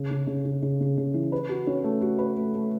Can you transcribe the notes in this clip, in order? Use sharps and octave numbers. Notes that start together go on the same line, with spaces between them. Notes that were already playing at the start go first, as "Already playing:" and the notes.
Already playing: C#3
C#3
C#3
C#3
C#3
C#3
C#3
E3
B4
F#4
C#4
A3
F#4
B4
A3
A3